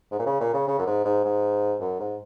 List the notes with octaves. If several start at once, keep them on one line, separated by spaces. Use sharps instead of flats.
G#2
A#2
C#3
A#2
C#3
C#3
F#2
G#2
G#2
G#2
F#2
G#2